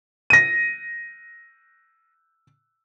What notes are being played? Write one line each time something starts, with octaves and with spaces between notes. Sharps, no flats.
A#6 D#7